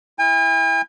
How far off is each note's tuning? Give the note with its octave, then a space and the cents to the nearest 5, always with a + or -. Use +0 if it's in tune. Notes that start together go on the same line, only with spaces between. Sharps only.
E4 +0 G#5 -45